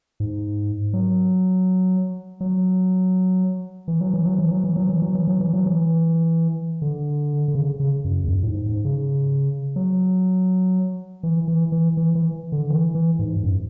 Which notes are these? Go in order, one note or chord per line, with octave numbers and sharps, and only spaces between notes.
G#2
F#3
F#3
E3
F#3
E3
F#3
E3
F#3
E3
F#3
E3
F#3
E3
F#3
E3
F#3
E3
D3
D3
C#3
C#3
F#2
E2
F#2
A2
G#2
G#2
C#3
F#3
E3
E3
E3
E3
E3
D3
E3
E3
G#2
G#2
F#2